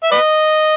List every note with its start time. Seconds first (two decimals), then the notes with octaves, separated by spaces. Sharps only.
0.03 E5
0.12 B4 D#5